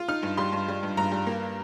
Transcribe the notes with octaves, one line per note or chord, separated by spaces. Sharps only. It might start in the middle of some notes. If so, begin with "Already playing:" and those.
Already playing: F4
D#4 F6
G2
G3 C6
G2
G3
G2
G2 A#5
G3
A#3